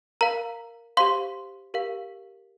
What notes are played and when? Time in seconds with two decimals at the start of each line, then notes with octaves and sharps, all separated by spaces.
0.21 A#4 F5 A#5
0.97 G4 C5 F5 C6
1.74 G4 A#4 F5